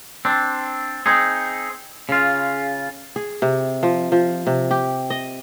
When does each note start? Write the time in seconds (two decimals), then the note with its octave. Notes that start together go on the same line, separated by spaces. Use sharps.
0.25 C4 D4
1.06 C4 D#4 G#4
2.09 C#3 F4
3.16 G#4
3.42 C3
3.83 F3
4.12 F3
4.47 C3
4.71 G4
5.10 D#5